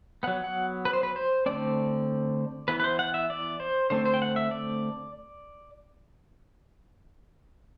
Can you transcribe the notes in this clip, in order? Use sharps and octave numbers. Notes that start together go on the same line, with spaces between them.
F#3 B3 F#5
F#5
B4
C5
B4
C5
D3 A3 C4 D5
E3 B3 B4
B4
C5
F#5
E5
D5
C5
D3 A3 C4 C5
C5
G5
F#5
E5
D5